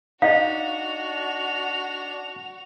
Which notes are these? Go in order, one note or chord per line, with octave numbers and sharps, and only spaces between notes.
D4 D#4 F#4 D#5 F5 F7